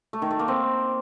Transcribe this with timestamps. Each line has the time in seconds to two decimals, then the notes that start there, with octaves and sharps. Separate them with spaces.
0.13 A3
0.22 D#3
0.31 A3
0.39 A#3
0.48 C4